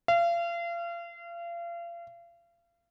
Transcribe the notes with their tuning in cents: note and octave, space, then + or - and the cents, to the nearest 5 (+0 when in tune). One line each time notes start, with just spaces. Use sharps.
F5 -35